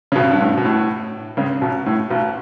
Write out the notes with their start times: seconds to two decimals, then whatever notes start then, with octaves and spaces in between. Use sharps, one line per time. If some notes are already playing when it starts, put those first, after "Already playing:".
0.12 C#3
0.16 B1 B2
0.31 G2
0.40 A2
0.57 B2
0.65 A2
1.37 C#2 C#3
1.61 B1 B2
1.86 A2
2.10 B1 B2